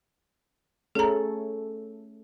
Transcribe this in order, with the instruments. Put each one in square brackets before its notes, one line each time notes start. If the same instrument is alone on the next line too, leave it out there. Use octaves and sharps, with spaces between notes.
[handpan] A3 C#4 A4 [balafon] G#4 A#5